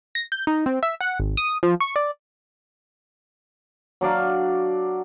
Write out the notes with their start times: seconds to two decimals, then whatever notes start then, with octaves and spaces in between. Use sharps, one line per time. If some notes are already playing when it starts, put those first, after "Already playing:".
0.15 A#6
0.32 G6
0.47 D#4
0.66 C4
0.83 E5
1.01 F#5
1.19 G#1
1.37 D#6
1.63 F3
1.80 C#6
1.96 D5
4.01 F#3 D4 D5 F5